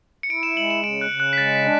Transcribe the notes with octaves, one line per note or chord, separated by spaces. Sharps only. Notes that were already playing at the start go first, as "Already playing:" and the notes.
C#7
E4 D7
E7
G#3 F#7
E7
C#3 D7
F#6
C#3
F#6
B6
G#3 A6
B6
D4